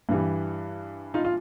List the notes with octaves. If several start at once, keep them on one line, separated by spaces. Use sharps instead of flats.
G2 E3 G3
D#4 F4
F4